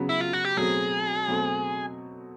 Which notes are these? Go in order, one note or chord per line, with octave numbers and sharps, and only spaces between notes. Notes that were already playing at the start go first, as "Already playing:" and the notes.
Already playing: C#3 F#3 B3
E4
F4
F#4
G4
B2 F#3 A3 C4 G#4
B2 F#3 A3 C4